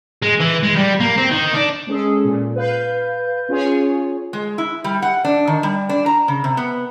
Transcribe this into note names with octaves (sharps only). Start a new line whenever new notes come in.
G#3
E3
G#3
G3
A#3
C4
D#3
D4
G#3 C#4 G#4 A4
A#2
B4 F5 G6
C#4 F4 G#4 C#5 G#5
G#3
E4
G3
F#5
D4
D#3
G3
D4
A#5
C#3
C3
B3